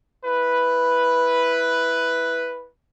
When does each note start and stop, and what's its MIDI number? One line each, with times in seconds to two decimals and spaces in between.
0.25 2.69 64
0.25 2.69 71